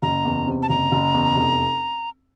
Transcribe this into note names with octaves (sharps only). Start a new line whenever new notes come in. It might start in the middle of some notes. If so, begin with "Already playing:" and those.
F#1 A#5
E2
C3
A5
F#1 A#5
F#1
E2
F1